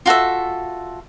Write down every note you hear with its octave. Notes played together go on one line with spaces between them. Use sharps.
F4 F#4 A4 E5